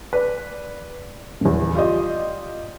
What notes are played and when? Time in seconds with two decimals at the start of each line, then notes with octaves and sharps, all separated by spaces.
0.13 B4 D5
1.41 D#1 E2
1.75 F4 G4 D5 D#5